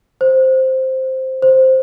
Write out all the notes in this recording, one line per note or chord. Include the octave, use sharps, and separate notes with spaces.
C5
C5